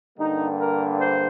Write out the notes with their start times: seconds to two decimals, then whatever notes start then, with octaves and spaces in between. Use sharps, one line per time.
0.18 G2 D3 G3 A#3 D#4
0.59 A#4
1.00 C5